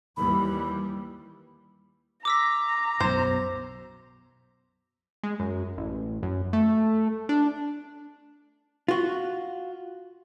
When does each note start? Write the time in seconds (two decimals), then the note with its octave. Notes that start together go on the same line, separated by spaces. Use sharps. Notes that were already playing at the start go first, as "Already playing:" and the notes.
0.17 D#2 E3 G3 B5
2.25 A#5 D6 E6 B6
3.00 B1 F#2 C5
5.23 G#3
5.40 F#2
5.77 A1
6.23 F#2
6.53 A3
7.29 D4
8.88 F4 F#4